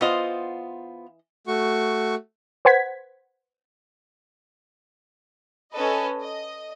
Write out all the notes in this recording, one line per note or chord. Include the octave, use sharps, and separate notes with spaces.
E3 B3 F4 C5 D#5
A3 F#4 C#6
B4 C5 F#5 G#6 B6
C#4 A4 B4 D#5
D#5